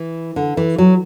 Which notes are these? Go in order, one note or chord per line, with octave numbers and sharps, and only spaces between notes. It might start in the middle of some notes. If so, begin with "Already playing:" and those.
Already playing: E3
D3
E3
F#3